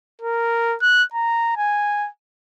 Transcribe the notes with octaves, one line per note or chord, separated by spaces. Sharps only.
A#4
F#6
A#5
G#5